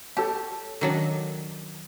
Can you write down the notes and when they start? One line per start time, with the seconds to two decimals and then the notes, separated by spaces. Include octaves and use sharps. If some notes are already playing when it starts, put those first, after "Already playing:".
0.17 G4 A4 C#5 A5
0.81 D#3 F#3 D4